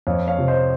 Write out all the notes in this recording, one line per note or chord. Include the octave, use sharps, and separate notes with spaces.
F2 C#5 F5
C#5 F5
C3 F3
C5 D#5